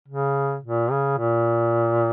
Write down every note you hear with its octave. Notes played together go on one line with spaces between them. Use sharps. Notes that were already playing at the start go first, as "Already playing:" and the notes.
C#3
A#2
C#3
A#2